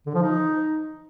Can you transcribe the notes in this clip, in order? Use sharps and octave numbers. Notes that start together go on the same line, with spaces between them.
D3
F3
D#4